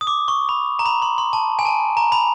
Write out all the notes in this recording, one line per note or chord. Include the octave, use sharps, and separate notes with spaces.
D#6
D6
C#6
B5
A#5
B5
C6
C6
A5
G#5
A5
A#5
B5